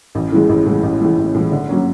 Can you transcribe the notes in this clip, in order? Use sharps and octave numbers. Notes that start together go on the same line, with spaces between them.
A1
A2 E3 G#3
A1
A2 E3 G#3
A1
A2 E3 G#3
A1
A2 E3 G#3
D3
F#3 A#3 C#4